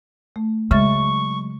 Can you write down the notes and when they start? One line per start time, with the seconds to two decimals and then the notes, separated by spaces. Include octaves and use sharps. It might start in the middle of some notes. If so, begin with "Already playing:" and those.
0.36 A3
0.71 C#3 F#3 G#3 E5 C#6 A6